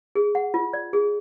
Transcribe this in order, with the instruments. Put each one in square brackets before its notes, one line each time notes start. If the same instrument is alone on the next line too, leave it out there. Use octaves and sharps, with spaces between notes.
[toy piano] G#4
F#5
F4
D5
G#4